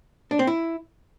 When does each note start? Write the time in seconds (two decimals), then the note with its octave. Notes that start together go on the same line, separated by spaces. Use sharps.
0.31 D4
0.39 C4
0.47 E4